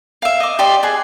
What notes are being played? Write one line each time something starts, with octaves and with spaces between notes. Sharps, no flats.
E5 F5
D#5 D6
G4 C5 D5 D#5
G#4 F#5